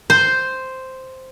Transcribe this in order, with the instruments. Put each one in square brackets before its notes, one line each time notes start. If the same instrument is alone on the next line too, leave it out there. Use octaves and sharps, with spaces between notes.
[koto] C5